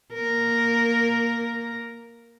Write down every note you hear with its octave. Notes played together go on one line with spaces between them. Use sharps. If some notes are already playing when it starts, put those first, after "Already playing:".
A#3 A#4